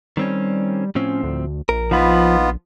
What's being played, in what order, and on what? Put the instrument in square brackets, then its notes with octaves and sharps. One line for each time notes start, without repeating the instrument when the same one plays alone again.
[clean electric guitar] D#3 C4 C#4 [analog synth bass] G3
[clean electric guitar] A2 F3 C4 [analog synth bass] C#4
[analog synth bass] D2
[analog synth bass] A#1 [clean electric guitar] A#4
[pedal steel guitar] F3 B5 [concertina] B3 F4 [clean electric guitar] D#4